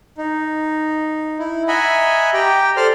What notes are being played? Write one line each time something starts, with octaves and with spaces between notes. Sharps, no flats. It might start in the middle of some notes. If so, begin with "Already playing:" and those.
D#4
E4
D#5 E5 F#5 G#5 A#5 B5
G4 G5 A#5
A4 C5 D5 C6 F6